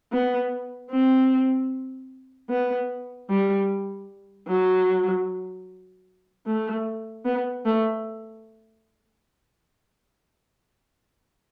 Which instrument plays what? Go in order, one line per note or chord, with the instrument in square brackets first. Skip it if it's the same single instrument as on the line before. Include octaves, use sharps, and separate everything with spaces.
[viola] B3
C4
B3
G3
F#3
A3
B3
A3